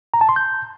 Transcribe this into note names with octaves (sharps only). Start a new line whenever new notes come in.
A#5
A5
C6
G6